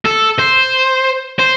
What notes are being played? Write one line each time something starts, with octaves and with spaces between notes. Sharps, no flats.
A4
C5
C5